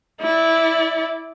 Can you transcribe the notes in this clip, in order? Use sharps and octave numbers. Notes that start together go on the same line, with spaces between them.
E4 D5